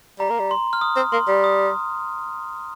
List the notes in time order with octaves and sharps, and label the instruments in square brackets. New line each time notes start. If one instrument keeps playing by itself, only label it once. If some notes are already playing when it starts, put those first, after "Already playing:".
[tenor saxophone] G3 [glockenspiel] A#5
[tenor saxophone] A#3
G3
[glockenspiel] C6
F6
D#6
[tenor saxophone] C4
[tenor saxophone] A#3 [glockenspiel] C6
[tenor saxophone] G3
[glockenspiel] D#6